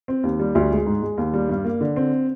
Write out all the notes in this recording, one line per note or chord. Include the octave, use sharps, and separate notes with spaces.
C4
D#2
G3
D2
G#3
G#2
G#3
D#2
G3
G2
A#3
D3
C4